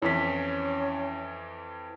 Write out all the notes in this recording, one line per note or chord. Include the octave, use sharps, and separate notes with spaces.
F2 E3 C#4 E4 B6